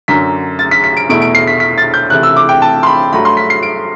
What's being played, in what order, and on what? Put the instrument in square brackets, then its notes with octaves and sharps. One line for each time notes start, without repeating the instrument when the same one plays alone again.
[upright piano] F#2 D3 F#3 B6
A6
B6
B6
D7
E2 B2 A3 E4 D7
D7
C7
B6
B6
A6
G6
C3 E3 A3 E4 F#6
E6
D6
G5
A5
C6
B5
G2 F#3 A3 B5
C6
B6
C7
D7